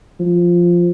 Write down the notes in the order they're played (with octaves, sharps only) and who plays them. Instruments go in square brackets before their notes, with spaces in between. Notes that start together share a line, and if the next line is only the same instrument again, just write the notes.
[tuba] F3